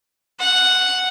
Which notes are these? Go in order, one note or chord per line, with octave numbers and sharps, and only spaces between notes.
F#5